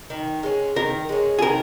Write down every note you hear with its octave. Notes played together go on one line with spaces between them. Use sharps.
D#3
G#3 C#4
D#3 A#4
G#3 C#4
G#4
D#3 A#4